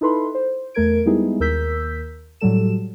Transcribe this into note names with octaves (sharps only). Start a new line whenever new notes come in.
D#4 E4 A4 B4 B5 C6
C5
E2 A3 A#4 G#6 D7
G3 G#3 B3 D#4 E4 G#4
D#2 A#4 E6 G6 B6
A2 F#3 G3 A4 E7